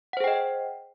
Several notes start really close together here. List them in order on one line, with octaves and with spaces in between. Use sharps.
F#5 C5 G#4 G5 D#5